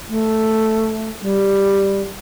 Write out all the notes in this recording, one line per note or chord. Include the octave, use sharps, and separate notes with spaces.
A3
G3